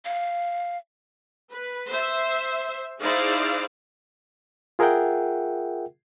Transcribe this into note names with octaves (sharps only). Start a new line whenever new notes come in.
F5
B4
C5 E5
D#4 E4 G#4 C5 D5 F5
F4 G#4 A#4 E5 F#5 G5